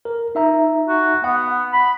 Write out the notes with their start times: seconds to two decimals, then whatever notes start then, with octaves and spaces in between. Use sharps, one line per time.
0.05 A#4
0.35 D#4 E5 A#5
0.89 F#4
1.24 B3 F#5
1.73 B5